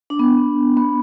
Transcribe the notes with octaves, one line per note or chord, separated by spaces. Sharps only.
D4
B3
B3